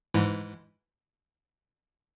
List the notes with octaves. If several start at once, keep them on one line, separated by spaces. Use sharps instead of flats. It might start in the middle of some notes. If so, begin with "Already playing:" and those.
G#2 E3